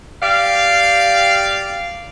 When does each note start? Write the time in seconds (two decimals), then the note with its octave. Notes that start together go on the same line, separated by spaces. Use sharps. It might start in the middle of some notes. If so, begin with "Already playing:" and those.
0.22 G4 D5 F5